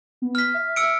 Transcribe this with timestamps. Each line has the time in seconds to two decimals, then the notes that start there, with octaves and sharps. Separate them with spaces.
0.22 B3
0.35 F6 B6
0.54 E5
0.76 E6 C#7 D7